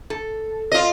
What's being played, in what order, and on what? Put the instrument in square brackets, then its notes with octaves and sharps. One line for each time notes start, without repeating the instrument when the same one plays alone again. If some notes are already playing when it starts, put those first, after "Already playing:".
[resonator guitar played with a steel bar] A4
[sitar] F4 D#5